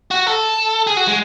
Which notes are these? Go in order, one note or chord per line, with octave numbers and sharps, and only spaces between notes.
F#4
A4
G#4
F#4
G#3